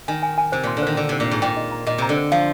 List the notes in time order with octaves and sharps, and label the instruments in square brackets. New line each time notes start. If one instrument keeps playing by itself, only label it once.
[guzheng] D#3 [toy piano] G#5
[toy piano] G#5
G#5
[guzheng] C3 [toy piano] C5
[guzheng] A#2 [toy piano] C6
[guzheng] D3
[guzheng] D#3 [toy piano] C5
[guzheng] D3 [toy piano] C5
[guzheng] C3 [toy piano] C5
[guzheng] A#2
[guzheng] G#2 [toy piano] C5
[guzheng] A#2 [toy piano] G5
[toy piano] D#5
A#5
[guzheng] A#2 [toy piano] D#5
[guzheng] C3 [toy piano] A#5
[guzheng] D3
[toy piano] C5
[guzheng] F3 [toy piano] F5